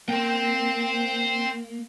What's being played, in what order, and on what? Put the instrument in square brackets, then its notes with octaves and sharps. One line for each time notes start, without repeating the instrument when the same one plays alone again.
[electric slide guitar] A#3 [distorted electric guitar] C5 G5